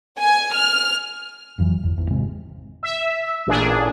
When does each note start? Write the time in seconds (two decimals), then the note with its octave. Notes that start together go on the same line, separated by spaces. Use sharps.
0.19 G#5
0.53 F6
1.58 F1 F2 E3 F#3
1.83 G1 E2
1.97 D#1 G#1 E2
2.10 G#1 C3 G#3 C4
2.83 E5
3.47 A1 A#2 D4 G#4